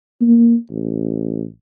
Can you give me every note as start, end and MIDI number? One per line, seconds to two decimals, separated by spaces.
0.21 0.55 58
0.70 1.44 33